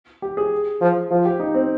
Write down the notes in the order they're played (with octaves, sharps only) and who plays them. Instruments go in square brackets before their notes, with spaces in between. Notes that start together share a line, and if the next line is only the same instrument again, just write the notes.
[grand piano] G4
G#4
[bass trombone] F3
[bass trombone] F3 [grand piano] F4
[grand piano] G4
D#4
C4